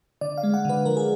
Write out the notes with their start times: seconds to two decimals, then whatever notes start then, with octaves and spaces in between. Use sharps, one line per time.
0.21 D3 D5
0.38 F5
0.43 G#3
0.54 F#5
0.65 D3 B4
0.85 F3 A#4
0.97 G#4